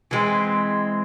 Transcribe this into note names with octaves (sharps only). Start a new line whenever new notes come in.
E3 G#3 C4